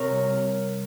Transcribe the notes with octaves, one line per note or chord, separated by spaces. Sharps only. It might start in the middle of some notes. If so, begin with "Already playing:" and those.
Already playing: C3 A#4 C#5
C2